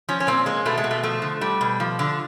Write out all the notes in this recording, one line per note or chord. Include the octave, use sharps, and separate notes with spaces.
F3 C#4
C#4
A#2 C4
G#3 A#3
B2 A3
G#3
B2
A3
F3 A3
D3
G3
B2
F3
D3